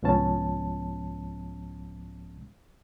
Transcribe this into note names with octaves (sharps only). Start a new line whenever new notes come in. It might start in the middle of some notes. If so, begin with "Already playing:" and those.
C2 G#2 F3 B3 C#4 A5